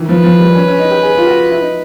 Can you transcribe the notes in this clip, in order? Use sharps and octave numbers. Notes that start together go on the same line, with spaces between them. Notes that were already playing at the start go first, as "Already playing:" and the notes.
Already playing: D#3 E3
F3 B4
F3
G3
C#4
C#4
D#4
G4
G#4
F4
F#4
E4
D#4